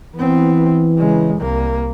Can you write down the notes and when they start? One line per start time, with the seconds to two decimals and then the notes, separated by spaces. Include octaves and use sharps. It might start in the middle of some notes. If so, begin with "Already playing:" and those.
0.15 E3 B3 C4
0.98 C#3 G#3
1.37 C2 A#3